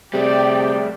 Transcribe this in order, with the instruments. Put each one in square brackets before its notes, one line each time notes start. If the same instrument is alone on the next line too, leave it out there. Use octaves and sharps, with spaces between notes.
[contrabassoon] C3 [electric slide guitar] G3 A3 [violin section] G4 D5 G5 [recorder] G#4